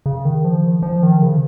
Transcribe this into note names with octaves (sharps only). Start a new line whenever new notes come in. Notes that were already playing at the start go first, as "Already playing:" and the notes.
C#3
D#3
F3
F3
D#3
C#3